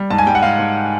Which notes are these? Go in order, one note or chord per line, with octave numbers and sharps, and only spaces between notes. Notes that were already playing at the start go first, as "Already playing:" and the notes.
Already playing: G3
G#2 A5
G#5
G3 G5
F#5
G#2 F5
G#2